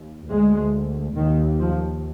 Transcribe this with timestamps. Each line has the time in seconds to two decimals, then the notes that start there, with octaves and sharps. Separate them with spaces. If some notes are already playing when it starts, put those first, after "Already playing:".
Already playing: D#2
0.30 D2 G#3
1.16 D#2 D#3
1.59 F3